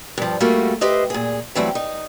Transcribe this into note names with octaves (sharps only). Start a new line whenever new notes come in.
G2 F3
G3 A3 A#3 F4 F#4
G4 B4 C5 D#5 E5
A#2 G#4
E3 F#3 G3 A3 C4 E4
D#4